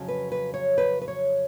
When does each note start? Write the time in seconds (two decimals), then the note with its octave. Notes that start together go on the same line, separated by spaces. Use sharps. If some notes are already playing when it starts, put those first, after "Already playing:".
Already playing: F2 C#3 F#3
0.08 B4
0.32 B4
0.54 C#5
0.78 B4
1.02 B4
1.08 C#5